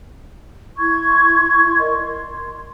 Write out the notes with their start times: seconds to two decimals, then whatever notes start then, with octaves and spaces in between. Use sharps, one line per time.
0.78 E4 C6 C#6 G#6
1.78 A#4 D5 D#5
1.94 C6